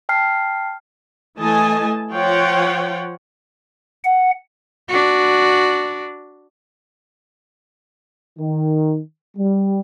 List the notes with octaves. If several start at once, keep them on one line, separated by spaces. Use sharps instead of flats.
G5 A5 F6 C7
E3 A3 D#5 G#5 A5
F3 F4 C#5 F#5 G5
F#5
D4 F#4
D#3
G3